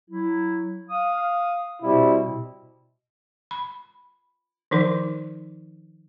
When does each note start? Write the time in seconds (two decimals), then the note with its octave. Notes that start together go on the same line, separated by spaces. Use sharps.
0.10 F#3 E4
0.90 F5 D#6
1.82 B2 G3 C4 E4
3.51 B5
4.71 D#3 F3 D#4 A#4